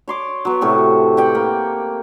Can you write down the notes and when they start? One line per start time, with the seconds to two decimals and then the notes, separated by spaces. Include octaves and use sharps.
0.08 C#5 C6 D6
0.45 F#3 B3
0.61 A2 C3 F#4
1.17 G4 B4 F#5 G5
1.35 A#3